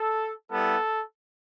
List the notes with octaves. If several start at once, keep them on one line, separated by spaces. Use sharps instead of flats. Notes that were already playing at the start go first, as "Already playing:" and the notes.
Already playing: A4
G3 B3 E4 A4